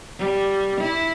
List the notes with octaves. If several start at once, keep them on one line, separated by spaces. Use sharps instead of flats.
G3
E4